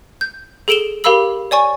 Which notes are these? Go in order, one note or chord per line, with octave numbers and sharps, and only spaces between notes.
G6
G#4 A4 D7 E7 G7
G4 A#4 F5 B5 E6 F#7
C#5 D5 G#5 C#6